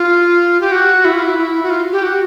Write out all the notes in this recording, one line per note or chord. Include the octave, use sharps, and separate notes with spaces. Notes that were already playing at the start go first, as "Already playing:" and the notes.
Already playing: F4
G4
F#4
E4
F4
E4
E4
F#4
F4
G4
F#4